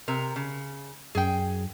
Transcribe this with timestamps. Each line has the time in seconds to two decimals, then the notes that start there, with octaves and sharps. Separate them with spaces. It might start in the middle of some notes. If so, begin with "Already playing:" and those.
0.08 C3 A#4
0.36 C#3
1.15 F#2 G#4 G5